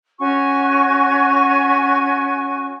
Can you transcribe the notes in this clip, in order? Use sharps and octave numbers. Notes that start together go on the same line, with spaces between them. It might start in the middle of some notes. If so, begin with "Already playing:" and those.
C#4 F#4 G#5 C#6